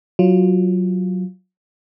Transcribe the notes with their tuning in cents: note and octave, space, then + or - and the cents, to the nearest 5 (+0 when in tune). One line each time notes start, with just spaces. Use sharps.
F#3 +0 F4 +0